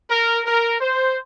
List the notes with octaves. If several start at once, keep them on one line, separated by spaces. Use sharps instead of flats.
A#4
A#4
C5